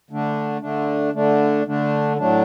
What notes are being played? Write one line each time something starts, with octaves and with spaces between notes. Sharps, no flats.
D3 A3 D4
D3 A3 D4
D3 A3 D4
D3 A3 D4
A2 F#3 A3 D4